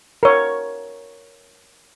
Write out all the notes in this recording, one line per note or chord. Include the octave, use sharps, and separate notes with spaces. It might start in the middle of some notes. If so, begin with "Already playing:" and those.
A#4 C#5